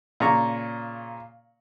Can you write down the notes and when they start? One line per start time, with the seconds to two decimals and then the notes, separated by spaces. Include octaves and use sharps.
0.20 A#2 C#3 A#5 C#6